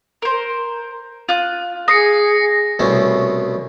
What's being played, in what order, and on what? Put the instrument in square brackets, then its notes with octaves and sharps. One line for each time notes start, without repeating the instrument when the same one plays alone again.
[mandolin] A#4 C5
F4 F#6
[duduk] G#4 [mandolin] D#6 [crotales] A#6 C7 C#7
[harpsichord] C2 B2 A3 C#4